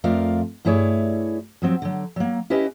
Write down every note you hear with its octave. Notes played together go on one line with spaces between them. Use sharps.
F2 A3 F4 A#4 D5 F5
G2 A3 E4 G#4 C#5 D5
F3 F#3 C4
D3 F#3
F#3 A#3
C#4 E4 G4 B4 D#5